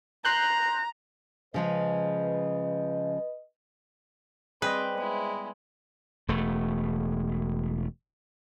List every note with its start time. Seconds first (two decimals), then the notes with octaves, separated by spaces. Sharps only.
0.25 A#5 C6 F#6 G6
1.54 C#3 F3 G#3 B4 D#5
4.62 G3 C4 G#4 B4 C5 D#5
4.97 G#3 B3 E4
6.28 E1 A3